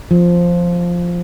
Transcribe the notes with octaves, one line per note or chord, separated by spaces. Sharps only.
F3